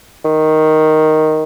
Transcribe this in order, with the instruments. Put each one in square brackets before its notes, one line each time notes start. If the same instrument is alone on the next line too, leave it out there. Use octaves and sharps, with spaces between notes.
[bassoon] D#3